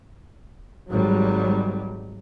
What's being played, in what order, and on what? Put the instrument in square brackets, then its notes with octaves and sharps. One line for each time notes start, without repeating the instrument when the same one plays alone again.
[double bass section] G#1 F#3 G3